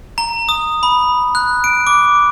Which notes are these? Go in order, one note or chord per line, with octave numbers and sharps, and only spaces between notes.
A#5
D#6
B5
F#6
D7
D6